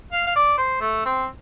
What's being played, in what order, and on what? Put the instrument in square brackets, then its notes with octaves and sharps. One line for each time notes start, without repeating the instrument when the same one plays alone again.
[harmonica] F5
F5
D5
C5
A3
C4